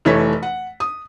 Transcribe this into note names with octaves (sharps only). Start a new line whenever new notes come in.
F1 E3 A3 C#5 B6
F#5
D#6